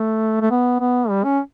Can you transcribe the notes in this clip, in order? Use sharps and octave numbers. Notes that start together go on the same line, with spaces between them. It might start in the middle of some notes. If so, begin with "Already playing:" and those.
Already playing: A3
A3
B3
B3
G3
C#4